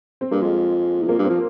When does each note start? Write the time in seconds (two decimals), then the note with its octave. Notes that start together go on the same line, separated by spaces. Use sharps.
0.21 C4
0.31 G2 A#3
0.42 F2 G#3
1.02 E2
1.08 F2 A#3
1.19 G2
1.25 C4
1.30 F3